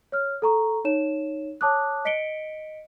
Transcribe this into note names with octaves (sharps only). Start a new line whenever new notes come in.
C#5 F6
A4 A#5 C#6
D#4 C#5 E7
C#5 A5 D6 D#6 F#6
D#5 B6 C#7 D7 G7